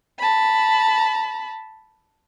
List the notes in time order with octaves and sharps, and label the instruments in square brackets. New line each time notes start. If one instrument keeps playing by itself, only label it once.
[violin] A5 B5